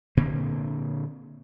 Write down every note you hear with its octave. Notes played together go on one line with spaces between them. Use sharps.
A#2 D3 A#3 C4